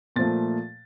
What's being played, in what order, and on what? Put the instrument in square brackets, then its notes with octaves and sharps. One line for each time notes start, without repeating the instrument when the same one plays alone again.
[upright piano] A#2 F3 A3 A6